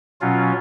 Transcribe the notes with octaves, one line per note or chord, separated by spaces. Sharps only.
B2 F#3 C#4 F4